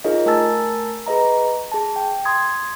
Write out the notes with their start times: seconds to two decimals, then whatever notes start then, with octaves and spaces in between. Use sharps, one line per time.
0.04 D#4 F4 G#4 A#4 C#5 D#5
0.26 A3 A#4 G#5 A5 E6 A6
1.06 G#4 B4 D#5 A#5
1.72 G#4 A5
1.96 G5
2.25 C6 D#6 G#6